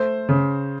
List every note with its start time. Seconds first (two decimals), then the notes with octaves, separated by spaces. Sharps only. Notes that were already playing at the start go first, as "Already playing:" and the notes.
Already playing: A3 C5
0.29 C#3